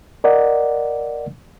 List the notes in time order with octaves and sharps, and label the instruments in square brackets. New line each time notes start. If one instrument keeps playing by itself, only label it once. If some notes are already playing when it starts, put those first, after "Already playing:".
[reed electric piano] A#4 D5 D#5 F#5